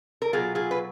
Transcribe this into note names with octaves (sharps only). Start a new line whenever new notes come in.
A#4
B2 F#3 F4 G#4
F4 G#4
B4